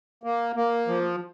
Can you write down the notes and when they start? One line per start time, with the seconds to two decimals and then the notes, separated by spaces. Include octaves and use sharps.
0.23 A#3
0.56 A#3
0.88 F3